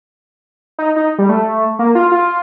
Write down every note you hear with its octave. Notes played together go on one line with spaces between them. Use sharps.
D#4
D#4
G3
A3
A#3
F4
F4